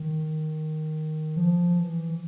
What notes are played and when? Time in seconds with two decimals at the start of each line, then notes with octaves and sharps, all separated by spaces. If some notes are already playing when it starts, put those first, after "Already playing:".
Already playing: D#3
1.36 F3
1.79 E3